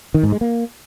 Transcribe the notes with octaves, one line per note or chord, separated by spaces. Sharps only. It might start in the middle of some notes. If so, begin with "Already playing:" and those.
D#3
G#2
G#3
A#3